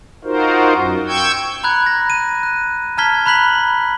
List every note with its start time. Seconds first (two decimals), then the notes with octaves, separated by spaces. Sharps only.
0.24 D#4 F4 F#4 A#4 C5
0.74 F#2
1.08 G5 C#6 E6 G6 G#6
1.64 A#5 B5 F#6 G#6
1.86 A#6
2.10 D#7
2.43 F#6
2.98 A5 A#5 F6 G#6 B6 G7
3.26 A#5 B5 F#6 B6 F#7